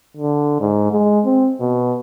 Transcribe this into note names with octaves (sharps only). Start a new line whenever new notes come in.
D3
G#2
G#3
C4
B2